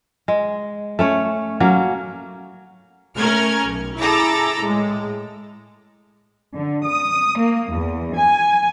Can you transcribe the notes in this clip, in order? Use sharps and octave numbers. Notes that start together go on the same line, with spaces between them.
G#3
A3 C#4 C#5
F#3 A#3 C#4
A3 C#4 A#4 F6 G#6
B1
E4 G#4 A4 A#5 D6
A2 G#3
D3
D#6
A#3
E2
G#5